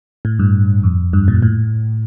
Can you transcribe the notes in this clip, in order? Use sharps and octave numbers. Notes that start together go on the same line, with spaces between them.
A2
G2
F2
G2
A#2
G2
A2